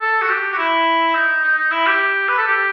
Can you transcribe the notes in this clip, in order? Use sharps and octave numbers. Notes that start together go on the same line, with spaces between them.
A4
F#4
G4
F#4
E4
D#4
D#4
D#4
E4
G4
B4
A4
G4